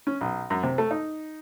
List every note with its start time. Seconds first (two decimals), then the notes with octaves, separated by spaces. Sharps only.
0.07 C#4
0.21 B1
0.50 F#2
0.63 C3
0.78 A3
0.91 D#4